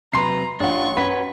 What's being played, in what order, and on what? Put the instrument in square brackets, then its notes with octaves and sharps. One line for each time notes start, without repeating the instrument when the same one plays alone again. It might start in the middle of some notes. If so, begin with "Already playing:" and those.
[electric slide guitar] C3 F#3 B4 [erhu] A#5 [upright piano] C6 C7
[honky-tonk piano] A1 F#5 [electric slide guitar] D4 F4 [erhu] C#6
[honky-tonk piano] F#2 F#5 B6 [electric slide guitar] C#4 B4